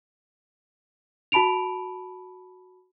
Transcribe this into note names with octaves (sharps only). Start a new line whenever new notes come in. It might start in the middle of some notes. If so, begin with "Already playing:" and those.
F#4 A5 B5 D7 F7